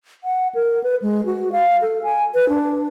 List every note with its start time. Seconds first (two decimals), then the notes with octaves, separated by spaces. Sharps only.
0.24 F#5
0.55 A#4
0.84 B4
1.02 G#3
1.26 F#4
1.52 F5
1.82 A4
2.03 G#5
2.35 B4
2.49 D4